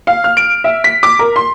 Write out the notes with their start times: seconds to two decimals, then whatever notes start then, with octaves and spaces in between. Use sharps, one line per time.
0.07 F5
0.24 F6
0.37 D7
0.64 E5
0.84 B6
1.03 D6
1.19 A#4
1.36 C6